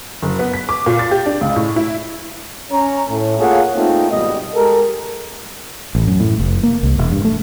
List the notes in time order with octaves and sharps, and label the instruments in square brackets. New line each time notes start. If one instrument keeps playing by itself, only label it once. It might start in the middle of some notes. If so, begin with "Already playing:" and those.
[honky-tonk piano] F#1
B3
B6
D6
A#2
A6
G4
D4
C#2
A2
E4
[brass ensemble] C#4 C#5 A#5
A2
A#3 F4 G#4 A4 C#5 F#5
A3 A#3 C4 D#4 F4
G#1 B2 G3 D#5
G#3 G4 A4 A#4
[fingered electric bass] A1
F#2
A2
F1
A#3
C2
E1
G2
A3